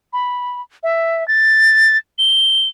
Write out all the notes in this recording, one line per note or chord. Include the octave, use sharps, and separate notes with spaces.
B5
E5
A6
G7